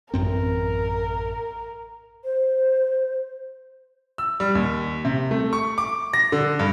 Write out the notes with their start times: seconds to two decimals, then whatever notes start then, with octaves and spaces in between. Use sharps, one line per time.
0.14 A1 F#2 C4 A#4
2.24 C5
4.18 E6
4.40 G3
4.55 D#2
5.05 C3
5.31 A3
5.53 C#6
5.78 D6
6.13 A#6
6.32 D3
6.59 G2